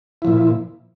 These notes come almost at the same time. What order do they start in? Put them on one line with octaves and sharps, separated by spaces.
E4 F3 A#2